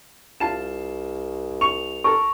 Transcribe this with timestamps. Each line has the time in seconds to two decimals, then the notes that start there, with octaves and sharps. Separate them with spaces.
0.40 C2 F4 A5 E7
1.61 C#6 F7
2.04 A4 A#4 C#6